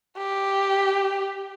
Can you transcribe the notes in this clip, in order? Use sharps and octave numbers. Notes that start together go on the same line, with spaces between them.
G4